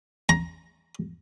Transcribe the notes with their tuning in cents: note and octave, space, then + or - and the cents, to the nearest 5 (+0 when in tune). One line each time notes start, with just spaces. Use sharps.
A#5 +15